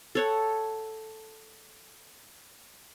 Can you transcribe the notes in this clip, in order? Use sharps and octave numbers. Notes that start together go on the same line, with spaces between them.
A4 C#5 F#5